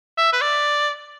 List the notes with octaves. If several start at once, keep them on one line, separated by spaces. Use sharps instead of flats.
E5
B4
D5